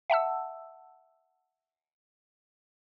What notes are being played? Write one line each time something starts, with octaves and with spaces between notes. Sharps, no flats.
E5 F#5 A5 E6